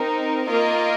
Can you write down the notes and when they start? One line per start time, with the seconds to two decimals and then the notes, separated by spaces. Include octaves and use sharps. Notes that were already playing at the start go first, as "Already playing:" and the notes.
Already playing: C4 D#4 A#4
0.47 A#3 F4 A#4 D#5